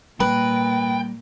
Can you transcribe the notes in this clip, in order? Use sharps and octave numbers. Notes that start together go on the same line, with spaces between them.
A#2 G3 A3 A#3 B4 G5